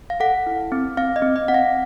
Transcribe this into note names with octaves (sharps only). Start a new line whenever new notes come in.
F5
A4 F#5
E4
C4
C4 F5
D#5
C4
D#5
C4 F#5
F5